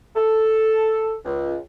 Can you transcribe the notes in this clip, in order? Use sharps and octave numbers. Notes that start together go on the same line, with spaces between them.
A4
C#2